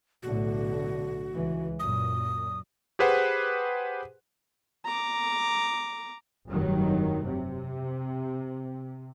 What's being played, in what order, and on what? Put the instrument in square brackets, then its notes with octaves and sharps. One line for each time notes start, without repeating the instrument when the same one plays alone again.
[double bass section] B1 A2 D3 [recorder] F#4
[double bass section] C#2 E3
[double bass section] F#2 A#2 [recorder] D#6
[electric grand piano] G4 G#4 B4 C5 F#5
[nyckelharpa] A#5 D6
[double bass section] F1 G2 D#3 F#3
C3